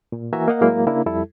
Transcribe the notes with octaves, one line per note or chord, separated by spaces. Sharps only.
A#2
E3 A#3 F#4 E5 G#5 A#5
A#3 A#4 D#5 F5 F#5
A2 F#3 G#3 A#3 E4
C#3 A#3 D4 E4
F2 G3 E4 A4